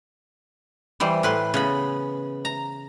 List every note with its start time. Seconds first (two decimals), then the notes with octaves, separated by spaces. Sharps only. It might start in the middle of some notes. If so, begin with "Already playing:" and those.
1.00 E3 G3 C5
1.23 A2 B4 C6
1.54 C#3 B3 B5
2.45 A#5